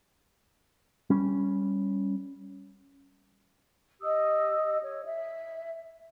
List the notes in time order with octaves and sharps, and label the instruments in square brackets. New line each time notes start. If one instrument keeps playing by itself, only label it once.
[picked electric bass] G3 C#4
[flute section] G4 D#5 D#6 E6
C#5
E5